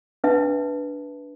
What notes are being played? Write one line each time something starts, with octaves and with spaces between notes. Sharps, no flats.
D4 B4 E5 A5